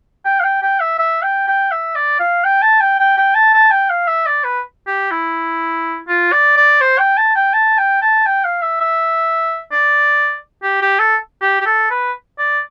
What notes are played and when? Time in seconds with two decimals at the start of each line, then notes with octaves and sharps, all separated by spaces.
0.25 G5
0.40 F5
0.44 G5
0.62 G5
0.80 E5
0.98 E5
1.22 G5
1.47 G5
1.71 E5
1.95 D5
2.19 F5
2.44 G5
2.62 A5
2.80 G5
2.99 G5
3.17 G5
3.35 A5
3.54 A5
3.71 G5
3.89 F5
4.07 E5
4.26 D5
4.44 B4
4.87 G4
5.11 E4
6.08 F4
6.32 D5
6.57 D5
6.81 C5
6.98 G5
7.17 A5
7.35 G5
7.53 A5
7.78 G5
8.02 A5
8.26 G5
8.44 F5
8.62 E5
8.81 E5
9.71 D5
10.62 G4
10.81 G4
10.99 A4
11.42 G4
11.60 G4
11.66 A4
11.90 B4
12.38 D5